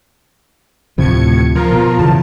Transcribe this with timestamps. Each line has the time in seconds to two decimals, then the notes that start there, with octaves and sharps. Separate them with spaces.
0.98 D2 A2 C3 F3 G#6 C#7
1.55 F3 F4 A#4
1.72 B2
1.99 F#2 C#3 E3 A5